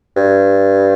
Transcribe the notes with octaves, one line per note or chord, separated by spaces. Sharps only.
G2